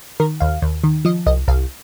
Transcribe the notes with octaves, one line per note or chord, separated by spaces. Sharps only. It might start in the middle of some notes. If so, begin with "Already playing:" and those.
D#3 A#4
D#2 F5
D#2
D#3
F3 D#5
C2 D#5
C2 F5